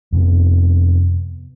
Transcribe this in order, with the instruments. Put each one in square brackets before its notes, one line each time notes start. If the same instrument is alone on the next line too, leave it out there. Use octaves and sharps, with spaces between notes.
[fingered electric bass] F2 C3 B3